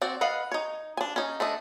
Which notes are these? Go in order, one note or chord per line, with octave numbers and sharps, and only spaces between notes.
C4 F#4 D5
B4 D#5 F5 F#5
D#4 C#5
D4 G#5
C#4 D#4
A3 D4 D#5